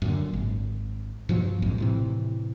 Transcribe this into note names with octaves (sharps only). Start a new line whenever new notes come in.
F#2 A#2 D3
G#1
G2 A#2 F3 F#3
A#1 F2 G#2
A2 C3 E3